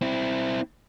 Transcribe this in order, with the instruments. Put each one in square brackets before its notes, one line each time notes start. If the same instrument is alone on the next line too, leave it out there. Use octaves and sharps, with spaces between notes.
[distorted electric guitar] C4 E4